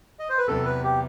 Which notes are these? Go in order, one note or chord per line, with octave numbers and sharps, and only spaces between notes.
D#5
C5
B4
E2 C3 F#3 B3 A4
B4
G4